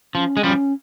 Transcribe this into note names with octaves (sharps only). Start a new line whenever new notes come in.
F3 C#4
G#3
F3 G3 C#4